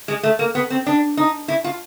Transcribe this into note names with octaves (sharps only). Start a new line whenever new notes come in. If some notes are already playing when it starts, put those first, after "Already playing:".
G#3
A3
A#3
B3
C4
D4
D#4
E4
F4